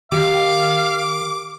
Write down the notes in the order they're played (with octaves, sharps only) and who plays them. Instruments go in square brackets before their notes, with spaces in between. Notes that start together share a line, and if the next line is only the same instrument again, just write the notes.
[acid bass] D#3 [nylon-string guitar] G4 [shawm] F5 [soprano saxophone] D6